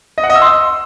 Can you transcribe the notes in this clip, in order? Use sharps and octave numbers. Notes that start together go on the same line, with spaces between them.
D#5
F#5
D#5
E6
C6